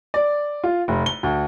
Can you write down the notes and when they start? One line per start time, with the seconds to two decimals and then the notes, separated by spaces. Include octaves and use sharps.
0.14 D5
0.64 F4
0.88 F1
1.06 G7
1.23 D2